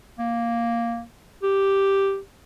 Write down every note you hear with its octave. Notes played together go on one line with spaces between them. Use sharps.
A#3
G4